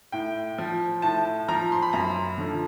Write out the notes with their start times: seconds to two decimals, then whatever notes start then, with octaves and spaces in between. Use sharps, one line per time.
0.12 A2 G5
0.58 F3
1.02 A2 A5
1.48 F3 A#5
1.72 C6
1.82 B5
1.93 F#2 A#5
2.38 D3 F3